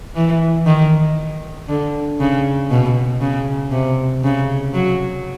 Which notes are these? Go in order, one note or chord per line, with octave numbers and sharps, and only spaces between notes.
E3
D#3
D3
C#3
B2
C#3
C3
C#3
F#3